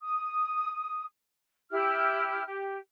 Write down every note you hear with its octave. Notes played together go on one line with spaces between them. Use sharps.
D#6
E4 G4 F6
G4